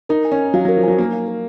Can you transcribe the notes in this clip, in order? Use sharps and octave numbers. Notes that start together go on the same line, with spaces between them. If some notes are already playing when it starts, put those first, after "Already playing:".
D#4 A#4
G#5
C#4
D#4
F#3 F5
F#3 A#4
F3
F#3 G#5
A#3 D#4
F5
A#4